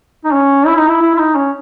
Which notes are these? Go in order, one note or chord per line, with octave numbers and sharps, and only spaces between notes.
D#4
C#4
E4
D#4
E4
E4
E4
D#4
C#4